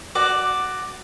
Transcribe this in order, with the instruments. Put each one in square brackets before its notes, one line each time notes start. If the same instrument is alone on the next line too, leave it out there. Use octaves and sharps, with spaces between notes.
[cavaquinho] F#4 D5 D6